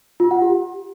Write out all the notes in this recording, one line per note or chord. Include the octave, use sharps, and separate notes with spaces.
F4
F#5
G4